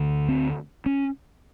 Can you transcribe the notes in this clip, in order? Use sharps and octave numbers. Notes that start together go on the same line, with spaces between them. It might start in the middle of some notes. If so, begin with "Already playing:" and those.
Already playing: D2 D3
C4
C#4